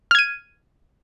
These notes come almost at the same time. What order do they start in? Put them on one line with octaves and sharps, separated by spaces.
F6 G#6 D#7